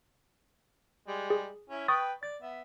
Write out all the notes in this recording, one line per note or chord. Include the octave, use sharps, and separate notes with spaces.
G3 G#3
G#4
C#4 E4
B4 G5 C#6 D#6 A6
D5 A6
B3 E5